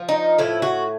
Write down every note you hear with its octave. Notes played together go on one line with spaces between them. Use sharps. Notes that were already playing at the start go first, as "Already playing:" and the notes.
Already playing: F3
D#4
A2 E4
F#4